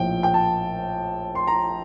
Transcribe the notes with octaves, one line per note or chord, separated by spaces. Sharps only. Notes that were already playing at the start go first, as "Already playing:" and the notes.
Already playing: A#1 A2 F3 G5
G5
A5
C6
A#5